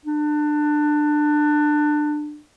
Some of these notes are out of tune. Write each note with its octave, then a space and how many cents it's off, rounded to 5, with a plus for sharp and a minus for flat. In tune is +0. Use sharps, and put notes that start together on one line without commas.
D4 +20